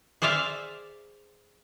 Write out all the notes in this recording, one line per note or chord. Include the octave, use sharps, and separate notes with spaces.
G#4 C5 D5 E5 F5